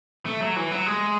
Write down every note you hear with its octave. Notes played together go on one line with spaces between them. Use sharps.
A3
F#3
E3
F#3
G#3